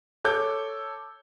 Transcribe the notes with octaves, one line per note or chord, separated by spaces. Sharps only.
A4 C#5 D6 G6